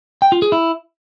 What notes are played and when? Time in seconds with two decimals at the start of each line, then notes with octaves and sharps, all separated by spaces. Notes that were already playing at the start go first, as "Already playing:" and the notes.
0.22 G5
0.32 F4
0.42 G#4
0.52 E4